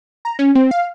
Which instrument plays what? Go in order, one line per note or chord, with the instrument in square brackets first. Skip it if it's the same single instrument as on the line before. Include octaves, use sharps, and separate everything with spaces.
[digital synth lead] A#5
C#4
C4
F5